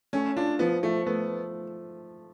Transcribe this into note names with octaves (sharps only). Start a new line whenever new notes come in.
A3 C#4
D4 F4
F3 B3
F3 A3
A3 B3